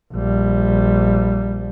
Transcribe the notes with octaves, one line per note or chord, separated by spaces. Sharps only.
A#1 G3